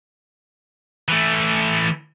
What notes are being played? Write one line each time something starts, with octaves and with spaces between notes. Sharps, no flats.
E3 A3